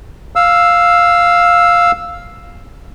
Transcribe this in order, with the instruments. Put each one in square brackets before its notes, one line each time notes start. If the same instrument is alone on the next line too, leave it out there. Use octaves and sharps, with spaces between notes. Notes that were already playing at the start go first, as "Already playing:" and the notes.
[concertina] F5 E6